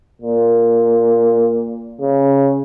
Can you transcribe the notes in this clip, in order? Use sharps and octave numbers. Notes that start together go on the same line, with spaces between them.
A#2
C#3